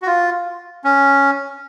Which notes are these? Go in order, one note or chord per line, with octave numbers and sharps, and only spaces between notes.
F#4
F4
C#4